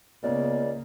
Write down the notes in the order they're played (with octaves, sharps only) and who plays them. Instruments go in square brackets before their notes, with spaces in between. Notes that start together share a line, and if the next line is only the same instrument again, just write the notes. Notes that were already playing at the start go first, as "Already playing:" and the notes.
[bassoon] C#2 [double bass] C#3 A#3 [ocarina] B3 [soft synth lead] D5